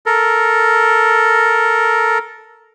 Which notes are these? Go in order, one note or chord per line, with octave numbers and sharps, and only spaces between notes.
A4 A#4